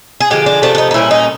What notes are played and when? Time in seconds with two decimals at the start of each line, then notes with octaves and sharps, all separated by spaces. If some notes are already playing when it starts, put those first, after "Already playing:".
0.20 G#4
0.30 D3 F3 G#3 G4
0.46 D4
0.62 C3 F3 A3 D4
0.75 D4
0.78 D#4
0.91 D#4
0.94 A#2 G3 A#3 C#4 E4
1.11 D#4